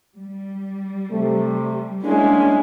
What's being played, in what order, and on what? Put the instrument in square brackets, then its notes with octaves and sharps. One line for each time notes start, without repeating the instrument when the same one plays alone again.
[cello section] G3
[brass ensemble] C3 A3
[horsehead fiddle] G#3 E4 [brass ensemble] A#3 C#4 D4